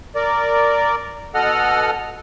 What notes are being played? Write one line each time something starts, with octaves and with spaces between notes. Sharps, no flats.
A#4 D5
B2 A4 D#5 F#5 F6